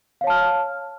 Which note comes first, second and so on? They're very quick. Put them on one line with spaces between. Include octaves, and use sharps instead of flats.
F5 C#5 A5 F6